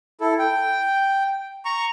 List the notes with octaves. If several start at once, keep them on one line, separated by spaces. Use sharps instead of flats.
E4 A4
G5
A#5 C#6